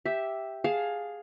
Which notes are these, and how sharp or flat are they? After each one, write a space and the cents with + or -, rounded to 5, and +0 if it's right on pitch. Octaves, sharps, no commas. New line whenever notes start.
G4 +0 E5 +0
G#4 +0 F5 +15 A5 +0